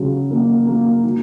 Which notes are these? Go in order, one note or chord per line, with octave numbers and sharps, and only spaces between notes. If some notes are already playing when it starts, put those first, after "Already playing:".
Already playing: C#3 F#3
A#3
A#3
F#3